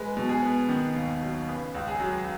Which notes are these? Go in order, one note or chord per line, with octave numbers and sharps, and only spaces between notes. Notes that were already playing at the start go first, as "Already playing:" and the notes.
Already playing: G#3 B4
B2
G#4
B3
D#3
D#2
F#3
C#3 B4
C#2
G#4
F#3